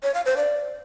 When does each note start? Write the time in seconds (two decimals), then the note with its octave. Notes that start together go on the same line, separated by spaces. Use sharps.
0.03 C#5
0.14 F5
0.26 C5
0.37 D5